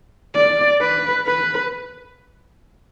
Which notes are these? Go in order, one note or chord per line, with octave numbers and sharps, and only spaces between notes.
D5
B4
B4